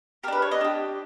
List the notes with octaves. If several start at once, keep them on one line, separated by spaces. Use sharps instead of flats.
D4 G4 A#4 B4
C#5
D#5
D4 G4